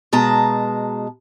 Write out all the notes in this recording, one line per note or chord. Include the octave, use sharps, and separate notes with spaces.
B2 G#3 A5 A#5